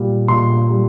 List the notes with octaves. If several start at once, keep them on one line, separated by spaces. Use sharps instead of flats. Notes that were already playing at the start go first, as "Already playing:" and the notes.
Already playing: A#2 G3
A#2 C6
G3